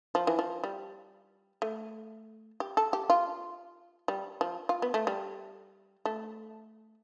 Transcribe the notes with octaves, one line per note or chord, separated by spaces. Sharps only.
F3
E3
F3
G3
A3
G4
A4
G4
F4
G3
F3
F4
B3
A3
G3
A3